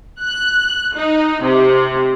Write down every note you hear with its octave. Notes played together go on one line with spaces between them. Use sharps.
F#6
D#4
C3